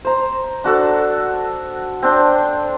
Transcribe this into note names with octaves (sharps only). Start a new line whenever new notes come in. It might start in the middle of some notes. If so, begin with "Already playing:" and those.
C5 A#5
D4 F#4 A4
C4 D4 G5